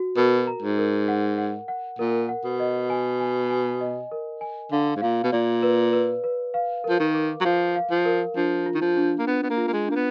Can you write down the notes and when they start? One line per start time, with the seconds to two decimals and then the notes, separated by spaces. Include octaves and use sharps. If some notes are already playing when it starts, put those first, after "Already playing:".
Already playing: F#4
0.17 B2 A#4
0.47 A#5
0.62 G#2
0.78 A#4
1.08 F#5
1.38 F#5
1.68 F#5
1.99 A#2 A#4
2.29 F#5
2.44 B2
2.60 D#5
2.90 G#5
3.20 G#5
3.50 G#5
3.81 D#5
4.12 A#4
4.41 G#5
4.72 D3 F5
4.96 G#2
5.02 A#2 F5
5.23 B2
5.32 A#2 D5
5.63 B4
5.93 B4
6.24 B4
6.54 F5
6.84 A#4
6.89 F3
6.99 D#3
7.14 D6
7.41 F#3
7.45 F3 F5
7.76 F5
7.91 F3
8.05 A#4
8.36 F3 D4
8.66 F4
8.75 D#3
8.81 F3
8.97 D4
9.19 A#3
9.27 B3 D4
9.43 B3
9.50 A#3
9.57 F4
9.67 A#3
9.73 G#3
9.88 A#3 D4
9.95 B3